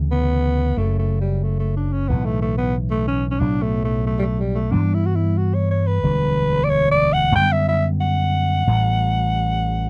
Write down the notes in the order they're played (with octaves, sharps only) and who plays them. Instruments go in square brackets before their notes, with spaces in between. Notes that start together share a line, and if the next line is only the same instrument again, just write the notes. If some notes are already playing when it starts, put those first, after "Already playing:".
Already playing: [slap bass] D2 C#3 E3
[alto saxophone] B3
[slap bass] F#1 F#2 C#3 [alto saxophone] A3
[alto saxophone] A3
G3
A3
A3
D4
C#4
[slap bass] B1 A2 E3 [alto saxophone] B3
[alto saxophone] A3
A3
B3
A3
C#4
C#4
[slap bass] B1 A2 F#3 [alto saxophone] D4
[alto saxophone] A3
A3
A3
G3
A3
G3
A3
[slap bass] G2 E3 G3 B3 [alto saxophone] D4
[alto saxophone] E4
F#4
E4
F#4
C#5
C#5
B4
[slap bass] E1 D2 D3 G3
[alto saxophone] D5
C#5
D5
F#5
[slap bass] F#2 D3 G3 B3 [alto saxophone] G5
[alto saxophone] E5
E5
F#5
[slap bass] A1 A2 E3 G3